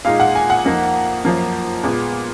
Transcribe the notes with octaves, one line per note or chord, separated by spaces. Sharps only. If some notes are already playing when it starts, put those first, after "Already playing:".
A#2 G#3 D#4 F5
F#5
G#5
F#5
F2 F3 A#3 D#4
F#2 F3 A#3
A#2 G#3 B3